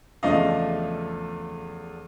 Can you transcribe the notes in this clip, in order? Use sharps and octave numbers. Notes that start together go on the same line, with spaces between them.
E2 C#3 F3 A3 D4 D#5 F5